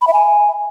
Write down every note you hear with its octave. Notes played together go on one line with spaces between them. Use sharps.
B5
E5
G#5